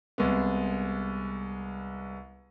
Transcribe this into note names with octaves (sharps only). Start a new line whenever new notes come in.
C2 G#3 B3